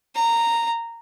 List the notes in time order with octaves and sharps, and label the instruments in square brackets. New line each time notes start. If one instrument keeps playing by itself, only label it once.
[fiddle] A#5